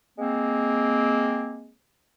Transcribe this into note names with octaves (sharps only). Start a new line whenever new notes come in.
G#3 A#3 C4